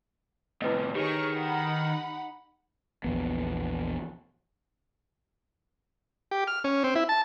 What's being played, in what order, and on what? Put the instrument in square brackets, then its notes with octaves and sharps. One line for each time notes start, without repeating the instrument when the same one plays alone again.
[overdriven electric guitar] A2 C3 [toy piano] E4 B4 D#5
[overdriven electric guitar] D#3 [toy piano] G4 [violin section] G#4 C#5 C#6
[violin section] D#4 F#5 B5
[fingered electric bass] A#1 E2 B3
[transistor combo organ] G4
F6
C#4
C4
E4
A5